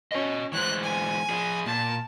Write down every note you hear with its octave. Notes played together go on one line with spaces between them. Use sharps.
C#4 F#4 D#5
E3 G#3 C5 F#6
G#5
F3 G#4
A#2 A5